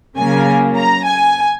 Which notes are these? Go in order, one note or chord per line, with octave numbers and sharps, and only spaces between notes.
C#3 F#3 A#3 G#5
A#5
G#5